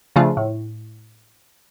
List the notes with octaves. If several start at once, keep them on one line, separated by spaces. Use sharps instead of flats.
C#3 F3 A3 D4 F4
A2